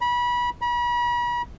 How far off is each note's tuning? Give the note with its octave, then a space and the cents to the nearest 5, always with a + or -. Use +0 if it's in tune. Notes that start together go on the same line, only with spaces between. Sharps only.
B5 -25
B5 -40